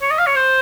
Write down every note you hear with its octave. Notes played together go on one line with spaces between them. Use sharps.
C#5
D#5
F5
C#5
C5